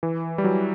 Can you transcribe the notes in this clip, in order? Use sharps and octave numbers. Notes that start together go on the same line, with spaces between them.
E3
G3
F#3